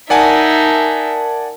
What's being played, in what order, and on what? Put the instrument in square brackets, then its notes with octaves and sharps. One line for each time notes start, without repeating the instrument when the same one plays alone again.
[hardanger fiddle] D#4 E5 [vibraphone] A#4 A5 [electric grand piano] D5 F#5 G#5